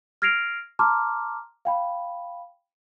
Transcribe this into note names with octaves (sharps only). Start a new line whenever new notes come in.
F6 G#6 A#6 C7 D7 F7
A5 A#5 C6 D6 F6
F5 G5 B5